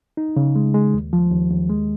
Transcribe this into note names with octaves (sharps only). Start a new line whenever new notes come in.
D#4
C#3
G#3
G#3
D#2
F3
D#2
D#2
G#3